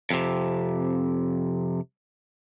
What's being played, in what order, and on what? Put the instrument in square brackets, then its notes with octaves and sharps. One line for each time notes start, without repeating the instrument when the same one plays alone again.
[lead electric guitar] F2 C3